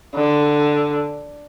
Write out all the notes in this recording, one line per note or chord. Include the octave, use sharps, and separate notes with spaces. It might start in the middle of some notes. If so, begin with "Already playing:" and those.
D3